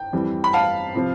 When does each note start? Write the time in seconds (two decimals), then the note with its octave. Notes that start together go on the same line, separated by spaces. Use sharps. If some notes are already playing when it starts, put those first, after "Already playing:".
Already playing: G5
0.13 F2 E3 G3
0.44 B5
0.53 F5 A5
0.95 C3 F3